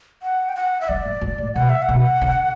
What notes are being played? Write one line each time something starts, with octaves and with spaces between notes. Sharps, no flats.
F#5
G5
F#5
E5
F#3 D5
F#3
F#3
A2
B2 F#5
E5
F#5
B2
D3